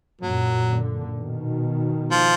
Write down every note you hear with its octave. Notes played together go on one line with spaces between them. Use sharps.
F#2 A#2 F#3
A#2 D3
B2 D#3
F3